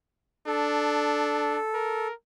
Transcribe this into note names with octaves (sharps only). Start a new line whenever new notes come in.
D4 A4
A#4